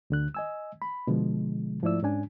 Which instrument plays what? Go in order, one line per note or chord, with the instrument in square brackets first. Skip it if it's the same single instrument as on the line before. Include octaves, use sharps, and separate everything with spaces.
[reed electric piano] D2 D3 F#6
D#5 G#5 E6
B5
B2 D3 F3 G#3
G#2 F3 A3 E4 D5 E6
G#2 C#4 D4 G#5